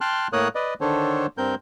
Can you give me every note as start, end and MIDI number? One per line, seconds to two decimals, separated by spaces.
0.01 0.28 79
0.01 0.28 81
0.01 0.28 84
0.01 0.28 89
0.01 0.28 90
0.33 0.48 45
0.33 0.48 58
0.33 0.48 70
0.33 0.48 73
0.33 0.48 87
0.33 0.48 90
0.55 0.74 71
0.55 0.74 74
0.55 0.74 75
0.81 1.26 50
0.81 1.26 51
0.81 1.26 62
0.81 1.26 69
0.81 1.26 72
0.81 1.26 73
1.38 1.55 43
1.38 1.55 60
1.38 1.55 70
1.38 1.55 91